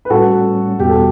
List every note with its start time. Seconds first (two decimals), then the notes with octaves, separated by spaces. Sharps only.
0.05 B4
0.10 A2 G3 C#4 F#4 A4
0.80 E2 B2 G3 B3 F#4 G4
0.89 A4